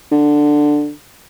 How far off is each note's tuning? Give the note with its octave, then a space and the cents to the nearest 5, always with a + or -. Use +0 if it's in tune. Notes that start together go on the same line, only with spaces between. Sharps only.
D3 +10